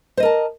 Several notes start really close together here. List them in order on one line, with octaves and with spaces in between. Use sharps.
C5 D#5 A#4 A5